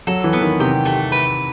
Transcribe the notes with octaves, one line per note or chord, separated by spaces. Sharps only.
F#3 A4
E3
B3
D#3
C3 G4
A3
B4